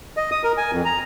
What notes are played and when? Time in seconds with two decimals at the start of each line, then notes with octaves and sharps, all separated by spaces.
0.17 D#5
0.31 D#6
0.44 A#4
0.57 G#5
0.71 F2
0.85 A#5